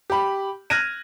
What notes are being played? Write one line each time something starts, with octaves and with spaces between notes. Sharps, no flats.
G4 B5
F6 F#6 G#6 A#6 D#7